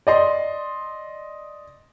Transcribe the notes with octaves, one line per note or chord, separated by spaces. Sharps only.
D5 D#5 C6